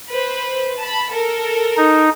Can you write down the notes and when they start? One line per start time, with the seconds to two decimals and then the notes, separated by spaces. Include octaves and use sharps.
0.10 B4 C5
0.80 A5 B5
1.11 A4 A#4
1.77 D#4